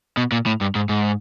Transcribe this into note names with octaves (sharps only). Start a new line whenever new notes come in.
B2
A#2
A2
G2
G#2
G#2